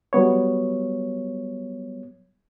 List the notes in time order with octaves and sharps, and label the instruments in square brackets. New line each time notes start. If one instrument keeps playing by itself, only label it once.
[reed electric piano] F#3 G3 B3 C#5